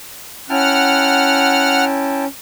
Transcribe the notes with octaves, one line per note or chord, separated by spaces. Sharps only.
C#4 E4 F#5 G5 A5 F6